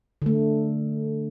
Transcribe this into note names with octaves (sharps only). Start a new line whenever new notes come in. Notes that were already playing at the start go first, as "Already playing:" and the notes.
D3 A3